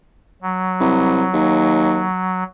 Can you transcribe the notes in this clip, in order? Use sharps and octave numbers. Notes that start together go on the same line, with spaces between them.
F#3
C2
D#2